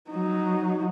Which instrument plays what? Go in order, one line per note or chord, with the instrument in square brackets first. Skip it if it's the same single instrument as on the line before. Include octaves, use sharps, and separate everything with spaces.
[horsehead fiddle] F#3 D#4